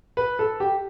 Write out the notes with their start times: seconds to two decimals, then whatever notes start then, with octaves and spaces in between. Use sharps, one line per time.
0.17 B4
0.39 A4
0.60 G4